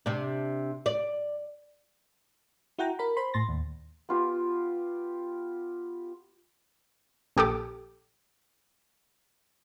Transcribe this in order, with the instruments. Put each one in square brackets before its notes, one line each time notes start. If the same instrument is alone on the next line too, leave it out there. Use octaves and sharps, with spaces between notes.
[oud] C3 D4
D5
[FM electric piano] E4 F#4 F#5 G5 A#5
A#4 B5
C5 B5 C6
A2 C6 A6 A#6
D#2
[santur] B3 F4 G4
[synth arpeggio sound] A#1 G4 A4 D6